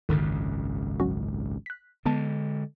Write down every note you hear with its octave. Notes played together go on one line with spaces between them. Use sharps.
G#1 C#2 F#2 D3 D#3
F#3 C#4 F#4
F#6 B6
D3 G#3 B3 A5